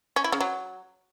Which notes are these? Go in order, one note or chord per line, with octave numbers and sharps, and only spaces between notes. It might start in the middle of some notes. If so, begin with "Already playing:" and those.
C#4
E4
C#3
F#3